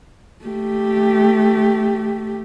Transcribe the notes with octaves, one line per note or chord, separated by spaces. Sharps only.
A3 G4